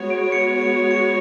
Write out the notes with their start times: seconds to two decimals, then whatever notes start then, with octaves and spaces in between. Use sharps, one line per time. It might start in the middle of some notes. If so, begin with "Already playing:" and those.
Already playing: G#3 B3 F#4 C#5
0.10 D7
0.32 C#7
0.62 C#7
0.91 C#7